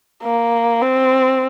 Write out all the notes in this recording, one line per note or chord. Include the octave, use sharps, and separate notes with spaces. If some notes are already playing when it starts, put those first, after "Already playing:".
A#3
C4